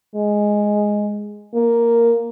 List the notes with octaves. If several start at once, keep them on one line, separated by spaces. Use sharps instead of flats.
G#3
A#3